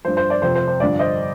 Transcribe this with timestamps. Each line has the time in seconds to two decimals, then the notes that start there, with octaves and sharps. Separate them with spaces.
0.05 G2 F3 C5
0.17 C5
0.30 D5
0.42 F2 C3 F3 C5
0.55 C5
0.68 C5
0.80 G2 D3 F3 D5
0.99 C5 D#5